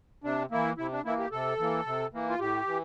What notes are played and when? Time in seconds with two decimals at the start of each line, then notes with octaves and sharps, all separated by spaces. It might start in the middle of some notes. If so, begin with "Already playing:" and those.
0.24 C3 D4
0.51 E3 A#3 E4
0.77 C3 E4
0.92 D4
1.05 E3 A#3 E4
1.19 G4
1.32 C3 A4
1.59 E3 A#3
1.86 C3
2.13 E3 A#3
2.29 F4
2.40 A2 G4
2.67 E3